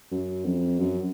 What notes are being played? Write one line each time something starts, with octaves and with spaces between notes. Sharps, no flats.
F#2
F2
F#2